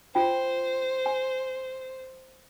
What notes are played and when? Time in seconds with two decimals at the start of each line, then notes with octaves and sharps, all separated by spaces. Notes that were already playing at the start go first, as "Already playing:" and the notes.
0.15 F4 C5 G5
1.06 G#5